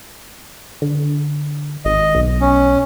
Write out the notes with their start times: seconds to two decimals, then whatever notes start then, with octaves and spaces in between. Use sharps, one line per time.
0.82 D3
1.85 G#1 D#5
2.15 B1
2.41 C#4